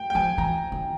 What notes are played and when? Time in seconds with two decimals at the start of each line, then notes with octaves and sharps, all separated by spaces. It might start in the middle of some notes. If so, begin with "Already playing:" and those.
Already playing: G5
0.10 G5
0.15 F3 G#5
0.38 E3 A#5
0.72 D#3